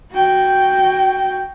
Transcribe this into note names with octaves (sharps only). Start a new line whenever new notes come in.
F#4 G5